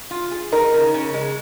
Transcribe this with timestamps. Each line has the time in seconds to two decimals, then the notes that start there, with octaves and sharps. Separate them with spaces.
0.11 F4
0.31 G#4
0.52 D#4 A#4
0.74 C#3
0.94 C#3
1.14 G#3